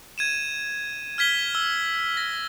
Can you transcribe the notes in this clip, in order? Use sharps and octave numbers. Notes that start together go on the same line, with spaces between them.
G#6 D#7 E7
F6 G#6 B6 G7
E6 G7
A#6